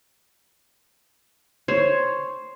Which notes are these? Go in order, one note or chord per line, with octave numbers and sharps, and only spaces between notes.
C5 C#5